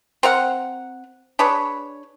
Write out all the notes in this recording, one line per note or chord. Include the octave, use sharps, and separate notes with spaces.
C4 A#4 F#5
D4 G#4 B4 C#5